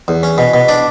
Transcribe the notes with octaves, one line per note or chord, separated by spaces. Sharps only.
E2
C#4
B2
B2
D4 D5